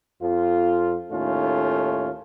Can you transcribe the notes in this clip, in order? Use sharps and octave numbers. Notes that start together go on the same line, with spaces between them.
F2 F4
D#2 A2 A3 C#4 D#4 F4